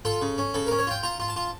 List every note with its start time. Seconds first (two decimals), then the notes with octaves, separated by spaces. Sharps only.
0.05 F4 A4
0.22 C#3
0.38 C#4
0.54 C#3 A4
0.67 C#4 A#4
0.79 C#5
0.87 F4 G5
1.03 F4 A#5
1.20 F4
1.28 A5
1.36 F4